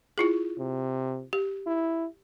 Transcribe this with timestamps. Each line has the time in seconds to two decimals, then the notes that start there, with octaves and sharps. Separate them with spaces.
0.18 E4 F4 G#4
0.58 C3
1.33 G4
1.67 E4